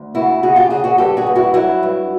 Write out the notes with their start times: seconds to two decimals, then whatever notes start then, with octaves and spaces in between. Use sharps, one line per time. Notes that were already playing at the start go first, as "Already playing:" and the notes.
Already playing: D2
0.15 C#3 E4 F#4
0.43 C#3 F#4 G#4
0.56 F4 G4
0.70 C#3 F#4 G#4
0.84 F#4 G#4
0.98 G2 G4 A4
1.17 F#4 G#4
1.27 G2
1.36 E4 F#4
1.54 F#3 E4 F#4
1.83 G2